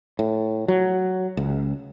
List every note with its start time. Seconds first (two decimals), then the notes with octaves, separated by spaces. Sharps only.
0.19 A2
0.68 F#3
1.37 C#2